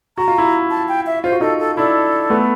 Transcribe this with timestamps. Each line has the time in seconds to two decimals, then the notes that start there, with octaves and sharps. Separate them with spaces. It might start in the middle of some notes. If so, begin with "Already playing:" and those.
0.17 F#4 A#5
0.28 F4
0.38 E4 F#4
0.70 A5
0.88 G5
1.06 E5
1.24 F4 C5
1.32 F#4
1.40 D#4 F4 A4
1.59 A4
1.77 D4 E4 A4
2.30 A3 B3